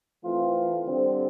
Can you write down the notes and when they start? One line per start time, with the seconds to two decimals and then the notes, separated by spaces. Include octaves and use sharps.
0.23 E3 A3 C4 F4
0.85 D3 G3 C4